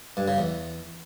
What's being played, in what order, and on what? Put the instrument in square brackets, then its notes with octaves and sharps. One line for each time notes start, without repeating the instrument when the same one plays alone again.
[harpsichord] G2
C#3
E2